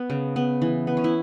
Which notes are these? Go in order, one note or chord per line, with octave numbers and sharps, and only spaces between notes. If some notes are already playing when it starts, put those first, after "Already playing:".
Already playing: B3
C#3
B3
E3
B3
C#4
E4